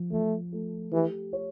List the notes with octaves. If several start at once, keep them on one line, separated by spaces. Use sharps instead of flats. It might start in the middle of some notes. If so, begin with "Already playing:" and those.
Already playing: F3
F3 A3
A3
E3 G4
C#5